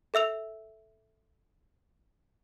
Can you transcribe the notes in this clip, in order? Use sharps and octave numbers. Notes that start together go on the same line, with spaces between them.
A4 E5 E6 F7